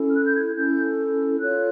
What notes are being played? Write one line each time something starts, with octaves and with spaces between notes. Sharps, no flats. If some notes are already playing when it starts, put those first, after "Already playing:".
Already playing: C#4 E4 A4
F6
F#6
G6
G#6
C#4 E4 A4 G6
F4 A4 C#5 F#6